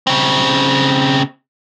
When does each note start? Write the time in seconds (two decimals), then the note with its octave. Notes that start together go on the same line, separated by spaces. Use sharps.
0.07 C#3 C4